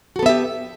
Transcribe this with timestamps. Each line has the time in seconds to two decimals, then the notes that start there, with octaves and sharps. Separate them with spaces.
0.16 F#4
0.19 A4
0.23 B3
0.26 E5
0.29 G4